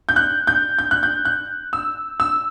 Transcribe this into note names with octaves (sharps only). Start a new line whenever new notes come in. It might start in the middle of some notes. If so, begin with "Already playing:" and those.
G6
F#6
G6
G6
F#6
G6
F#6
E6
E6